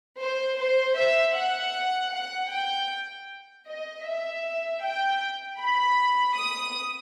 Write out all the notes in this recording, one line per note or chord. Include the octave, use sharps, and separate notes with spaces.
C5
C5
E5
F#5
F#5
G5
D#5
E5
G5
B5
D#6